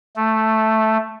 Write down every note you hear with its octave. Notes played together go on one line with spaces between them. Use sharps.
A3